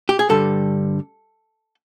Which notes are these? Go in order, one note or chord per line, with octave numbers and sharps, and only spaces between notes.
G4
G#4
G2 D3 G3 A4